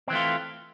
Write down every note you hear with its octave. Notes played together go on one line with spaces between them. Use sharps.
E3 A3 C4 F4